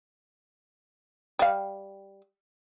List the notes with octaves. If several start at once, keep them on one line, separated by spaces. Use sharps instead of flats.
G3 F5